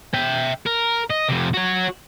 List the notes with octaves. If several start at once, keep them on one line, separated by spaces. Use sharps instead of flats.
E5 G5
A#4
D#5
F2 C3
F#4 C#5